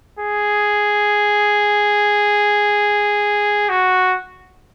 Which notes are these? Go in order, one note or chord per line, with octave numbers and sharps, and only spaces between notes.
G#4
F#4